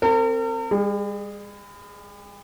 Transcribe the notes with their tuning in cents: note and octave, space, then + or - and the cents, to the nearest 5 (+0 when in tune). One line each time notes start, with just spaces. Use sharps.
C4 +0 A#4 -45
G3 +45 G#4 +5